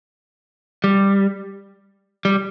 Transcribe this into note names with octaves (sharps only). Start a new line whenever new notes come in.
G3
G3